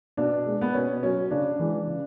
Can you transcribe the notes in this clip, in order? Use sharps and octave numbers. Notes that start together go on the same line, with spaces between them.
B2 D4
G#3
B3
B2 C#4
F#3 C#4
C#3 D4
E3 G#3
C#3